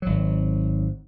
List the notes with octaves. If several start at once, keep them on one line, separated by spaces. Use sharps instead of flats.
G#1 F#3